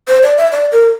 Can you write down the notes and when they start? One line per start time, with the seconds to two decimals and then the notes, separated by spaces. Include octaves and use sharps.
0.08 C5
0.23 D5
0.38 E5
0.52 D5
0.72 A#4